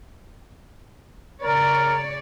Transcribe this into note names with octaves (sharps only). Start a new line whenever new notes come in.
C#3 A#4 C#5 D5